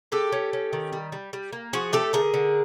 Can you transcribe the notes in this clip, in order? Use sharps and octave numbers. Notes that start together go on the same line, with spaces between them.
G#3 G4 A4
C#4
C#4
D#3
G3
G3
G3
A#3
F3 F#4 G#4
A3 G4 A4
D3 G#4 A#4
D3